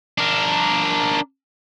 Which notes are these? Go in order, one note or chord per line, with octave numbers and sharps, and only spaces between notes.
D4 A#4